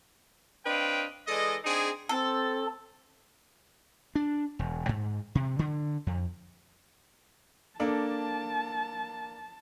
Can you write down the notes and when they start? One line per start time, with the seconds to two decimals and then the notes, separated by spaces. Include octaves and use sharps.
0.65 C4 D4 B4 D#5 F5 G5
1.27 E3 G#3 A4 D5 D#5
1.64 C4 D4 D#4 G#4
2.09 C4 A4
4.15 D4
4.59 E1
4.89 G#2
5.35 C3
5.59 D3
6.07 F2
7.80 A#3 D4 A4 A5